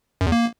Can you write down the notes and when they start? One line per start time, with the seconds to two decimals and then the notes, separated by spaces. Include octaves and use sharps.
0.21 F#2
0.26 E2
0.32 A#3